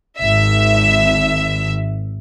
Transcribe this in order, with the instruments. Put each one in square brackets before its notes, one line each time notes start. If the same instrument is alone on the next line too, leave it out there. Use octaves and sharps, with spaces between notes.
[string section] G#1 E5